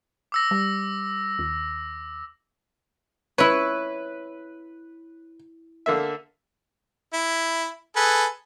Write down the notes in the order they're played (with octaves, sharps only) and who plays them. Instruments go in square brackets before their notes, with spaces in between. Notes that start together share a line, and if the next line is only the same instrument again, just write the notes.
[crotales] D6 E6 A#6
[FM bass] G3
D#2
[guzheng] E4 C#5 [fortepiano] B4
[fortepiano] D3 A#3 E5
[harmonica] E4
G#4 A4 B4